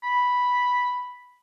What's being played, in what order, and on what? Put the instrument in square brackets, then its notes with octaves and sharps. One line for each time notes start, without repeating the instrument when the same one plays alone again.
[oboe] B5